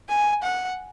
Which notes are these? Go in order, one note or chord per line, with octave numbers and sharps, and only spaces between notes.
G#5
F#5